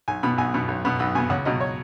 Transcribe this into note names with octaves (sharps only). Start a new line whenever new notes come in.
B1 G#5
B2 B3 B5
B1 G#5
B2 B3
B1
B2 B3
B1 B5
B2 B3 G#5
C#2 F#5
B2 F#3 D#5
C#5